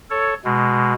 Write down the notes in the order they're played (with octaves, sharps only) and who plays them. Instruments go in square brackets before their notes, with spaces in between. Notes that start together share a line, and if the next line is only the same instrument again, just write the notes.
[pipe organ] A4 C#5
B2 G#3